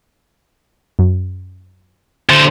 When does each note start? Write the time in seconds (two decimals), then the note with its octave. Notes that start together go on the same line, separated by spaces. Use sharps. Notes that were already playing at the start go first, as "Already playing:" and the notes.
0.99 F#2
2.29 D3 C5 F#6 A6 C#7